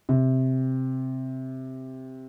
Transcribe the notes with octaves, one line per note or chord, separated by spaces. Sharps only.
C3